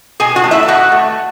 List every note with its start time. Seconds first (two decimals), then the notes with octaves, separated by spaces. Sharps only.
0.20 B2 G#4 G#5
0.36 F#4 F#5
0.44 A3
0.51 E4 E5
0.63 E5
0.68 B2 F#4 F#5
0.92 A3